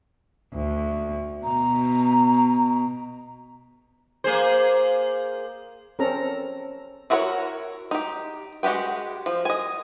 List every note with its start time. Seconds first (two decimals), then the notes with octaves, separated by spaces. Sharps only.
0.54 D2
1.44 B2 A#5
4.24 A#3 G#4 C5
5.99 C4 C#4 A4 A#4 A#5
7.10 E4 F#4 A#4 C5 C#5
7.91 D#4 G4
8.63 G#3 F#4 G4 B4 G5
9.26 F3
9.45 D#5 G#5